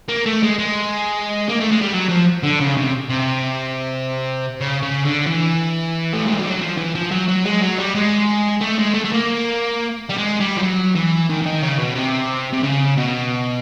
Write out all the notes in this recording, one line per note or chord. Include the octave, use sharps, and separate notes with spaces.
A#3
A3
G#3
G#3
A#3
A3
G#3
G3
F#3
F3
D3
C#3
C3
C3
C#3
C#3
D3
E3
A3
G#3
G3
F#3
F3
E3
F3
F#3
F#3
G#3
F#3
G3
G#3
A3
G#3
A3
A3
A#3
G3
G#3
G3
F3
F#3
E3
D#3
E3
D#3
C#3
B2
C3
C3
C#3
B2